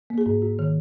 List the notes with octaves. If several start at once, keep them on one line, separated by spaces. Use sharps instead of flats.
A#3
G#4
G#2
G#2 F#4
D#3